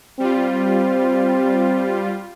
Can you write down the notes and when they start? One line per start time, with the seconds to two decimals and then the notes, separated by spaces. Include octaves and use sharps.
0.20 G3 C4 F4